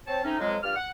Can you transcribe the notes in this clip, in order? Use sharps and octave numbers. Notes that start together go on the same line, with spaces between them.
C4 C#5 A5
A3 C4 C#4 D#4
F2 F#3 G#3
G2 F4 D5 F6
F#5